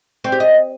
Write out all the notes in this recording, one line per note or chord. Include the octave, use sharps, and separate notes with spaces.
C4
G4
D#5